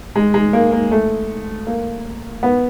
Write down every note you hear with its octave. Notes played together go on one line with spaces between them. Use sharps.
G#3
G#3
A#3
A#3
A3
A#3
B3